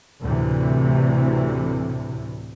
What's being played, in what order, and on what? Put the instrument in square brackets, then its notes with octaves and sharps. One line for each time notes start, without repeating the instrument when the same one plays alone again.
[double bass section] D2 A2 C3 E3